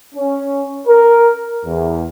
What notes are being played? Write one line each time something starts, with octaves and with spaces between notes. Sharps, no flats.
C#4
A#4
E2